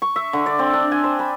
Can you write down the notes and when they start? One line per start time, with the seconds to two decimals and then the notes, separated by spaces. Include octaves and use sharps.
0.02 C#6
0.16 E5
0.33 D3
0.46 D5
0.59 C4
0.73 D4
0.92 G#5
1.04 C5
1.19 B5